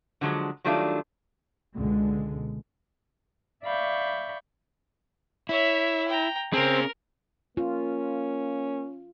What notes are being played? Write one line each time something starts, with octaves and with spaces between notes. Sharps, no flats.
D3 F3 F#3 G#3
D#3 F#3 G3 A3 D4 F4
C#2 B2 D3 G#3
D5 E5 F5 B5 C#6 G6
E4 C#5 E5
G5 A#5
C4 C#4 G#4 A#4
A#3 C#4 F4